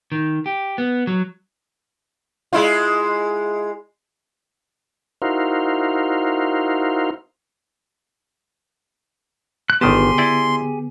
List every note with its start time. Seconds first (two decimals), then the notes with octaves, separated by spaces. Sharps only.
0.12 D#3
0.46 G4
0.78 B3
1.07 F#3
2.53 G#3 E4 F4
5.22 D#4 E4 F#4 A#4 C5 F5
9.70 F#6
9.81 G1 D3 D#3 B3 G4 G#4 A5 C6
10.18 E4 D5 G5